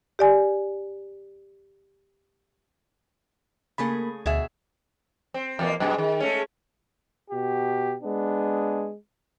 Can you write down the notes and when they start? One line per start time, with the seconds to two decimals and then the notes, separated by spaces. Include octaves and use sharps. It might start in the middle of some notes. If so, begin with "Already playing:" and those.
0.19 G4 D5 G#5
3.78 C#3 A3 A#3 G#4 B5
4.26 D2 B2 G#4 E5
5.34 C4
5.59 E2 B2 A#3
5.80 F#2 B2 G#3
5.98 D#3
6.20 G#3 A3 C#4
7.30 B2 F#4 G4
8.03 G#3 B3 D4